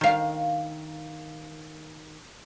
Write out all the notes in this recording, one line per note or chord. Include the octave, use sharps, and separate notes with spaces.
D#3 F5